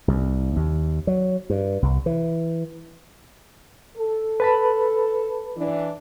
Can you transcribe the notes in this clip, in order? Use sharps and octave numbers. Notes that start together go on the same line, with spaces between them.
C2
D#2
F#3
G2
C2
E3
A4
B4 A5 B5
E3 D4